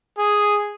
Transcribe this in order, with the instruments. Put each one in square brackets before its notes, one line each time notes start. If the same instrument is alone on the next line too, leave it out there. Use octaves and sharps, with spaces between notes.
[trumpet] G#4